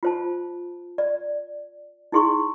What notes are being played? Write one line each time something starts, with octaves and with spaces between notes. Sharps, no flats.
F4 C5 A5
D5
D#4 E4 G#4 C6 C#6